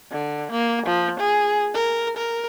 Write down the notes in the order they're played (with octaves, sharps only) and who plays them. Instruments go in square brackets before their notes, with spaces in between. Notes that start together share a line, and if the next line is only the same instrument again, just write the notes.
[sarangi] D3
A#3
F3
G#4
A#4
A#4